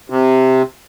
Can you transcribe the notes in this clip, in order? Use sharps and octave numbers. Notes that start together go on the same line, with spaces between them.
C3